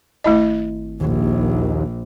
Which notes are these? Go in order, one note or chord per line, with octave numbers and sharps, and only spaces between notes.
G#1 A3 E4 D#5
A#1 D#2